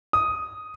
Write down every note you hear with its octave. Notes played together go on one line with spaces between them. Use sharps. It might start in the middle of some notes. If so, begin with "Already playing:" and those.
D#6